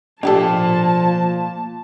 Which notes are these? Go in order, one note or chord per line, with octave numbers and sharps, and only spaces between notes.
F3 A#3 D4 G4 A4 D5 A5